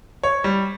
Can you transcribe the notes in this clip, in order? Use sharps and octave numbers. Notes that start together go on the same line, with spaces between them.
C#5
G3